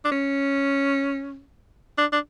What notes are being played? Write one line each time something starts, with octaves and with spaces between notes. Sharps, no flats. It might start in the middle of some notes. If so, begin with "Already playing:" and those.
D4
C#4
D4
D4